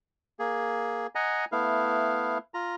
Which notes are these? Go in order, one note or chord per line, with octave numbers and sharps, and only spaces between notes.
A#3 G#4
D#5 F#5 G#5 A#5
A3 B3 E4 F5
F4 A#5